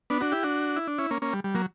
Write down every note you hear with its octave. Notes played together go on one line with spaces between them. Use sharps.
B3 D4
D4 F#4
E4 G4
D4 F#4
E4
D4
C#4 E4
A#3 C#4
A#3 C#4
G3
G3
F#3 A#3